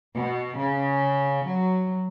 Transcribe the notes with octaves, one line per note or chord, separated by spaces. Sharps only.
B2
C#3
F#3